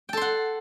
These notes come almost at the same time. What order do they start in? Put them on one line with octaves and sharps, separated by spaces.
G5 A4 C6 F#5